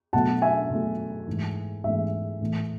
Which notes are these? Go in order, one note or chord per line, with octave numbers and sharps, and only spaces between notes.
B2 F#3 A3 F#5 A5
E5 G#5
B2 F#3 A3
G#2 E3 A3
G#2 E3 A3 E5
A2 E3 A3